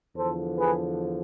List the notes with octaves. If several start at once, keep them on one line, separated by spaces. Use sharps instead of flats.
E2 D3 F3 A4 C5
G#4 B4